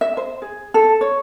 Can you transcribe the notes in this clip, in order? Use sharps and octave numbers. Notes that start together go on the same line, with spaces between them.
E5
C5
G#4
A4
C#5